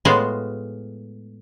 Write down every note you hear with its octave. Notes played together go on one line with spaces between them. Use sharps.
A2 G#3 B3 F4 F#4 G#4